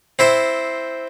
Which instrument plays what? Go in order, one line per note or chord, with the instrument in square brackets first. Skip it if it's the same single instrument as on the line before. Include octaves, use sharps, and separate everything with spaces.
[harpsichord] C4 E4 C5